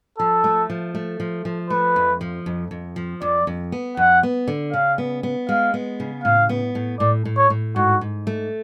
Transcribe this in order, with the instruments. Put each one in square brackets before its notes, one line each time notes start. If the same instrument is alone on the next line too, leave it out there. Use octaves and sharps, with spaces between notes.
[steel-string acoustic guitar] F3 [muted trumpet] A4
[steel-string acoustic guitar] A3
F3
A3
F3
F3
[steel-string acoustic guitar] A3 [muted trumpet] B4
[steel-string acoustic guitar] F2
F3
F2
F2
F3
[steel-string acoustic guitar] F2 [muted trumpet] D5
[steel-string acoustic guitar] F2
B3
[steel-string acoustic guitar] F2 [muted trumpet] F#5
[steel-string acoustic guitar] B3
D3
[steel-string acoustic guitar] C#3 [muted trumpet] F5
[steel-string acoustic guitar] B3
B3
[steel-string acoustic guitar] G#3 [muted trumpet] F5
[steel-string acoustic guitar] B3
C#3
[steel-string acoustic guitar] A2 [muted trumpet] F5
[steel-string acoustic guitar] B3
A2
[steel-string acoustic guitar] A2 [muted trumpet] D5
[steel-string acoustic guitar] A2
[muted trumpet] C#5
[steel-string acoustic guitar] A2
[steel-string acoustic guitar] G#2 [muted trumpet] F#4
[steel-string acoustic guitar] G#2
A3